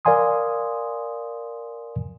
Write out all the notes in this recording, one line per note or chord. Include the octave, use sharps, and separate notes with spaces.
A#4 D5 F5 G#5 C6 D#6